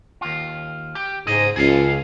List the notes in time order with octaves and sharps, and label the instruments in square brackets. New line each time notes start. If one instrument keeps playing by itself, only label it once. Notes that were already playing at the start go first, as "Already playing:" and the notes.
[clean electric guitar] D#2 F4
G4
[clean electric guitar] C#2 G#4 D#5 [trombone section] G#2
[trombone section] C#2 [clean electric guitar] G#4 A4 F5